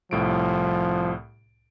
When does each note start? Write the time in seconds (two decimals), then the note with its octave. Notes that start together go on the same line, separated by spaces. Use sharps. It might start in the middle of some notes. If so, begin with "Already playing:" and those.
0.11 C2 A2 F3 D7